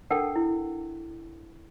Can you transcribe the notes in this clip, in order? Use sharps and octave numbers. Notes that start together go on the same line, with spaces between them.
D4 A4 A#4 F#5 G5 A5
E4